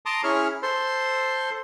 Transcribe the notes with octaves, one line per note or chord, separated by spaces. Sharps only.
A5 A#5 C6 D6 D#6
C#4 E4 G#4 C#5 F6
A4 C5 C6